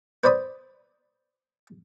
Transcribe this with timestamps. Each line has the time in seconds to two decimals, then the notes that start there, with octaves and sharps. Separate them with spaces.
0.24 B4 C5 D5 B5 D#6